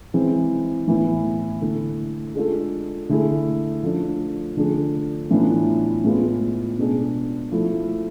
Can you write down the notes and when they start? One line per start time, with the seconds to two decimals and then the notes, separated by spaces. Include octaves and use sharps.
0.14 E3 G#3 C4
0.88 A2 E3 B3 E4
1.61 D3 A3 E4 A4
2.35 G#3 D4 F4 A4
3.09 D3 A3 E4 G#4
3.83 F3 A3 D4
4.57 D3 F3 A3 D4 G#4
5.31 A2 E3 B3 D4 F4
6.04 A2 G#3 B3 F4
6.78 B2 G#3 D4 G#4
7.52 F3 A3 E4